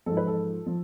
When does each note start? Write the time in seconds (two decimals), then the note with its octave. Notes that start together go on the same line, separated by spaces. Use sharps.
0.06 G#2 F3 A4
0.17 B4
0.27 A4
0.66 F3